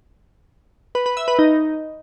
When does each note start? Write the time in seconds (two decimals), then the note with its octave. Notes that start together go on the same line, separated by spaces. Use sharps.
0.95 B4
1.06 B4
1.17 E5
1.28 B4
1.39 D#4